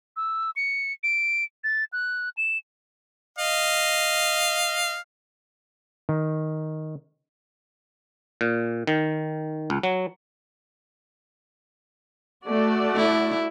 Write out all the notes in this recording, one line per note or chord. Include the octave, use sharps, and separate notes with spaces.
E6
C#7
D7
A6
F#6
E7
D#5 F5
D#3
A#2
D#3
C#2
F#3
A3 F#4 D5
E4